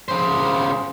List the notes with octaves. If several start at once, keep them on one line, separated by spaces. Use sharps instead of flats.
C#3 C5